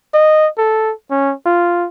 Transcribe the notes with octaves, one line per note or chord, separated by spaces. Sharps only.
D#5
A4
C#4
F4